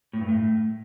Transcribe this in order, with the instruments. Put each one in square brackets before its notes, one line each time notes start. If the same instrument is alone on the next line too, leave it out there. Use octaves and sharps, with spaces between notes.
[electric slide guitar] A2
G2
A2